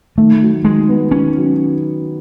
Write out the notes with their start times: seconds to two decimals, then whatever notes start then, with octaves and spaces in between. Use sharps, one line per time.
0.18 D#3 A3
0.41 F#3
0.65 D#3 G#3
0.88 B3
1.11 D#3 C#4
1.35 F#3